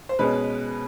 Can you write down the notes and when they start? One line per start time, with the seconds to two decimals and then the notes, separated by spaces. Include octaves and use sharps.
0.09 C5
0.19 B2 G#3 C#4 B4